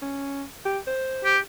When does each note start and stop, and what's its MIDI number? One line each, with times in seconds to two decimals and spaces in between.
0.02 0.43 61
0.65 0.79 67
0.87 1.35 72
1.24 1.38 67